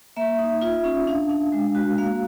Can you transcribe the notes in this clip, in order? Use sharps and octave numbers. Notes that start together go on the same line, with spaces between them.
A#3 E5
D#4
F4
C#4
D4 F5
D4
G#3
F#4
A#3 F5